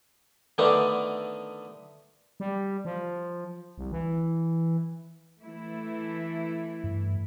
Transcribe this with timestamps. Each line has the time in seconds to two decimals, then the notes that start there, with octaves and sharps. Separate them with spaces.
0.58 D3 D#3 A3 B3 D4
2.40 G3
2.85 F3
3.78 C2
3.92 E3
5.42 E3 A3 E4
6.84 G2